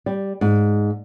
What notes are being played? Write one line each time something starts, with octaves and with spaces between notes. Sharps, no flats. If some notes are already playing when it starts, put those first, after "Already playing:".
G3
G#2